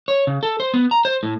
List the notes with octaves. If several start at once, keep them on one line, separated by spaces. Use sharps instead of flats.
C#5
C#3
A4
C5
B3
A#5
C5
A2